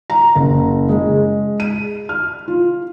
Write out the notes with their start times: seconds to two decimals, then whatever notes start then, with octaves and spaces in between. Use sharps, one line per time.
0.10 A#5
0.35 F#1
0.89 G#3
1.60 D#7
2.09 F6
2.48 F4